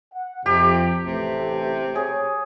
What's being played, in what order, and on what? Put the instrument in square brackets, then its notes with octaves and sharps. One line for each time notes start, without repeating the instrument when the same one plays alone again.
[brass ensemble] F#5
[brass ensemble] F2 [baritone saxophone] C3 [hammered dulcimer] G4
[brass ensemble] A1 A3 [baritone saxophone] C3
[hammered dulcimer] G#4 [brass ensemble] C#5